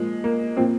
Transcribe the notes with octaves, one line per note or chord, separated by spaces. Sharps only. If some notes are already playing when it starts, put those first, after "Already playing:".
Already playing: A#2 F3 G#3
A#3
A#2 F3 C4